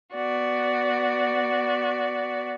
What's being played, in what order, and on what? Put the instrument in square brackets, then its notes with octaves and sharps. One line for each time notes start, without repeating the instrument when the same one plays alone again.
[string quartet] B3 F#4 D5